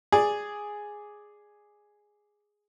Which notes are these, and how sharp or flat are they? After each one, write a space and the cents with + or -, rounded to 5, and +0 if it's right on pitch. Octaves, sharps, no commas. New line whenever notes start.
G#4 +0 D5 +0